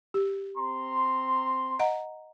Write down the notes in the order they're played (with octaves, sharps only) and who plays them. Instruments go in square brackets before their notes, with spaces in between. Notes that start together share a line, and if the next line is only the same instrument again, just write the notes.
[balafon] G4
[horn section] C4 A#5 C6
[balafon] D#5 F#5 A#5